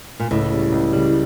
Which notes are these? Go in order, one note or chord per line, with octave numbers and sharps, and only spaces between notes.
A#2
C#2 A2
C#3 G3
C#2
C#3 G3